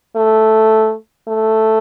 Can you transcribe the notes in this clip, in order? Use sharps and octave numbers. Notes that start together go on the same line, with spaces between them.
A3
A3